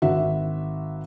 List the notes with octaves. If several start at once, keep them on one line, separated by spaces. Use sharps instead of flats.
G#1 F#4 E5